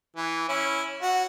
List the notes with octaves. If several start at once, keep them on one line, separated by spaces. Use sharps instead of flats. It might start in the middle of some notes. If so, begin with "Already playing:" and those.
E3
C#4 E4
F#4